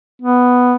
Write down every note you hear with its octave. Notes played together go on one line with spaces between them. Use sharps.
B3